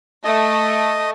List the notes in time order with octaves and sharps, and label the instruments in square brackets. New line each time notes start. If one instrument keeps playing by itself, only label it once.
[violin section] A3 [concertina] D#5